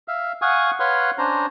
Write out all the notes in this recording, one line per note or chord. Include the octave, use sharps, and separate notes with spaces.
E5 F5
F5 F#5 G#5 C#6 D#6
B4 C#5 F5 F#5 C6
C#4 D4 C5 A#5